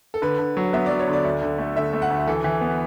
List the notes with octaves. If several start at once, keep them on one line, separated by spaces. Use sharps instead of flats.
A4
D3 B4
D3
F#3
B3 E5
F#3 D5
C#5
D3
D5
D2
D3
A3
D3 E5
A3
F#5
D2
E3 A4
E3
B3